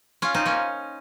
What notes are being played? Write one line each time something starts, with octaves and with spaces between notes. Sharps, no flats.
C#4 F4
C4 D#4
A#3 C#4